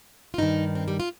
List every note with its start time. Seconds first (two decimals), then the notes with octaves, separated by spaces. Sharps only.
0.34 F4
0.38 G2 D#3 D#4
0.75 C4
0.88 G3
1.00 F4